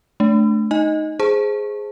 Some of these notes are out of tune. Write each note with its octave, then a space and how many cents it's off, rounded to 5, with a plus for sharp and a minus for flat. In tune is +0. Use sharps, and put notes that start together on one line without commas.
A3 -20 D4 -10
D#4 +0 D#5 +0 G#5 +0
G#4 +5 C5 +0 A5 +0